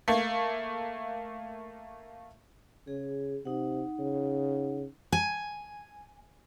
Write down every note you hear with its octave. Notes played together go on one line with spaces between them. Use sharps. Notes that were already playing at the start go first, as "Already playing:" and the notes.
A3 A#3
C#3 G#4
C3 D#4 F#5
C#3
G#5